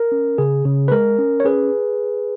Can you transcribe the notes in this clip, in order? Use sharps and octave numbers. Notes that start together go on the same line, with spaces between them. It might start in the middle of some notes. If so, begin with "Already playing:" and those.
Already playing: A#4
C#4
C#3 G#4
C#3
B4
G#3 A#4
C#4
C#5
C#4 G#4 B4